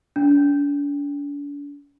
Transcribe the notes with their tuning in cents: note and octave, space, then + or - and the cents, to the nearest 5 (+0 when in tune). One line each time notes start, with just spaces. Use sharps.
D4 -40